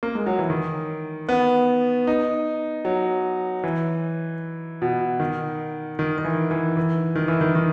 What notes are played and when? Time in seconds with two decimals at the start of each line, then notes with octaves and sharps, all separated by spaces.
0.03 A#3
0.15 G#3
0.26 F#3
0.39 E3
0.50 D#3
1.29 B3
2.07 D#4
2.85 F#3
3.64 E3
4.82 B2
5.20 D#3
5.99 D#3
6.18 D#3
6.25 E3
6.51 E3
6.77 E3
7.15 D#3
7.28 E3
7.41 D#3
7.55 D#3